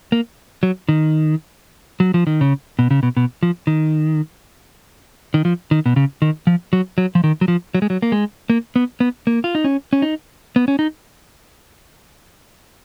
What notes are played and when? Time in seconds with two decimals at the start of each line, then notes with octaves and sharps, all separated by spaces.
0.12 A#3
0.63 F#3
0.89 D#3
2.00 F#3
2.14 F3
2.27 D#3
2.41 C#3
2.79 B2
2.91 C#3
3.03 B2
3.17 B2
3.43 F3
3.67 D#3
5.34 D#3
5.45 F3
5.71 D#3
5.86 B2
5.96 C#3
6.22 D#3
6.47 F3
6.73 F#3
6.98 F#3
7.15 F3
7.24 D#3
7.41 F#3
7.48 F3
7.75 F#3
7.82 G#3
7.90 F#3
8.02 A#3
8.12 G#3
8.50 A#3
8.76 B3
9.00 B3
9.27 A#3
9.44 F4
9.55 D#4
9.64 C#4
9.93 C#4
10.02 D#4
10.56 B3
10.68 C#4
10.79 D#4